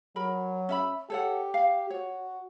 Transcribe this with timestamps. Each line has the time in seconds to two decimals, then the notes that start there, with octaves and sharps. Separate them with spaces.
0.16 F#3 A#4 B5
0.69 C#4 E5 B5
1.10 G4 A4 C#5 F#5
1.54 F5
1.90 F#4 C#5